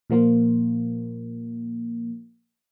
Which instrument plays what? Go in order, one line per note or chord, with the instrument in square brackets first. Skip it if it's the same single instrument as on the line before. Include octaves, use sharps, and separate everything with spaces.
[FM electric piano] A#2 F3 A#3 F4